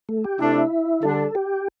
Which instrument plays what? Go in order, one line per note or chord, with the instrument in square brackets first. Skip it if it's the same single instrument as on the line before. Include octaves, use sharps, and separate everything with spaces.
[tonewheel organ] A3
G4
[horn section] C3 A3 D4 [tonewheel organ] E4
[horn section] D3 G3 D4 [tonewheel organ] A4
[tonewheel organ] G4